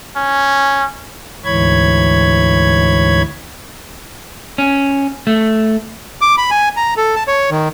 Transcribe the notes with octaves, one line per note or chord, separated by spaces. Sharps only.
C#4
D2 G#2 E3 C#5 B5 G#6
C#4
A3
D6
B5
G#5
A#5
A4
A5
C#5
D#3